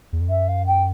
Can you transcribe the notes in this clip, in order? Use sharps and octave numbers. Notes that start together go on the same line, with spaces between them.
E2
F2
F#2 E5
F5
G5